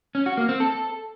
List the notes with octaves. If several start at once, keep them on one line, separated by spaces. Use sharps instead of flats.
C#4
F#4
A#3
C4
A4